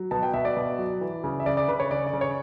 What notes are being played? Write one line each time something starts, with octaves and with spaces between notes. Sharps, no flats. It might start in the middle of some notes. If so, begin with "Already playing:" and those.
Already playing: F#3
B2 A5
G5
B2 E5
D5
B2
F#3
E3
C#3
E5
C#3 D5
D5
C#3 B4
C#5
C#3 D5
D5
C#3
C#5